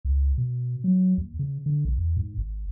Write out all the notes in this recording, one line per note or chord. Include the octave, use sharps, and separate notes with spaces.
C#2
B2
F#3
D#2
C#3
D3
A#1
E2
G#2
G#1